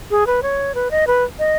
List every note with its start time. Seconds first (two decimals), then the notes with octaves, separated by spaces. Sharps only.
0.11 G#4
0.27 B4
0.43 C#5
0.75 B4
0.91 D#5
1.07 B4
1.39 D#5